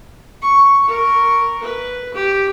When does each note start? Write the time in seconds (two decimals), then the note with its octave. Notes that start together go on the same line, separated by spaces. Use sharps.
0.42 C#6
0.83 A#4 C#6
1.62 B4
2.14 G4